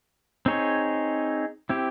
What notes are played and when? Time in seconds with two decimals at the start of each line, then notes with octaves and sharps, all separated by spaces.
0.46 C4 D#4 G#4 C#5
1.69 C4 E4 G4